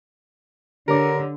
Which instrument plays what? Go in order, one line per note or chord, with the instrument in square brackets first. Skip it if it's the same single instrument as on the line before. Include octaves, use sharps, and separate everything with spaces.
[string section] D3 [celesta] G4 C#5 D6 [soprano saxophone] A#4